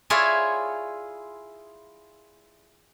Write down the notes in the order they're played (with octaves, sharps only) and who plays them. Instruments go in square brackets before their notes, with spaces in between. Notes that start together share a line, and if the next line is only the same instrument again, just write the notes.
[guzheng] E4 F4 G#4 C#5 D5 E5